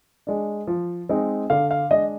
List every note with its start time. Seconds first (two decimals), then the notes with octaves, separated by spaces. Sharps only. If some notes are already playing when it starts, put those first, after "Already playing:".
0.27 G#3 D4
0.67 F3
1.09 G#3 C4 D#4
1.50 D3 F5
1.71 F5
1.91 G#3 D4 D#5